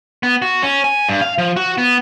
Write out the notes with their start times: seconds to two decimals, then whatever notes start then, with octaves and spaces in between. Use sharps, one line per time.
0.23 B3
0.42 F#4
0.63 C#4
0.84 G#5
1.09 G2
1.22 F5
1.38 F3
1.57 F#4
1.78 B3